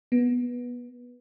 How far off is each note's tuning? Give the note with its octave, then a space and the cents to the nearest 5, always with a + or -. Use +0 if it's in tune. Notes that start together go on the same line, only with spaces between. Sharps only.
B3 -15